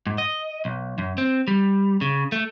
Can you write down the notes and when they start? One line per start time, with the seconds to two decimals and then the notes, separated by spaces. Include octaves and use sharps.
0.07 G#2
0.18 D#5
0.65 B1
0.98 F#2
1.18 C4
1.48 G3
2.01 C#3
2.32 A3